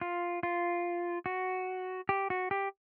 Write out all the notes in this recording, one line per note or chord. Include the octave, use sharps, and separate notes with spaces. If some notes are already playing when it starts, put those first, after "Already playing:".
F4
F4
F#4
G4
F#4
G4